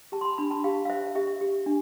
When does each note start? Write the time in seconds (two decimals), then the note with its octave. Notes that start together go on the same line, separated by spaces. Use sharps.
0.12 G4 A5
0.21 C6
0.25 B5
0.38 D4 B5
0.51 A5
0.64 G4 F5
0.85 F5
0.90 C5 E5
1.15 G4 E5
1.41 G4
1.66 D4